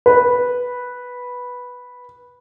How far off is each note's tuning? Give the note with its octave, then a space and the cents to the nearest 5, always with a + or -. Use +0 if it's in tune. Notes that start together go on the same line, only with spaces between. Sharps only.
B4 -5